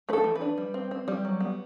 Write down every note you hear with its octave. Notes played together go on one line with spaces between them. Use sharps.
A3 A4 B4
E3
B4
D4
G3
C4
C4
G3
F#3
B3